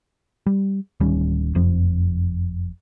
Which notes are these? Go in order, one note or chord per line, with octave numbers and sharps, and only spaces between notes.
G3
D1 D#3 G3 C#4
F#1 F2 F3